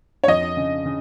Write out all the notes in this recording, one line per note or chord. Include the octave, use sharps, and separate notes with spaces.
C#5
F2 D#5
C#3
C#3